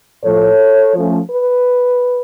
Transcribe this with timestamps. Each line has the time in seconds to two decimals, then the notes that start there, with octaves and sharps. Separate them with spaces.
0.23 A2 F3 A3 A4 C#5
0.95 F3 A3 C#4
1.30 B4